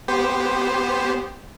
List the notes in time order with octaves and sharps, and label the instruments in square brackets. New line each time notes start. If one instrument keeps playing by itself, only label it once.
[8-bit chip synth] B3 G4 C5